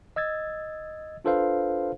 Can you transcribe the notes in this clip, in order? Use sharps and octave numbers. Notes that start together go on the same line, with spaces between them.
D#5 E6 G#6 A6
D4 F4 A4 B4 C5 F5